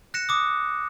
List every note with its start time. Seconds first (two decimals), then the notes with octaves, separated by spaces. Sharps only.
0.14 F#6 A#6 C#7 E7
0.29 D6 D#6